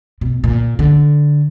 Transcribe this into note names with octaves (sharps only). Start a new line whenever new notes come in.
B2
A#2
D3